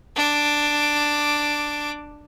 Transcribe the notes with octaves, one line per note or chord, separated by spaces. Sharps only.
D4 D6